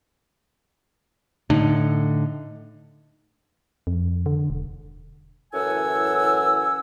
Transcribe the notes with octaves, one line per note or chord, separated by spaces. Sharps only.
A2 D3 D#4
F2
D3
E1
F#2 A2 E3 F#5 G#5 E6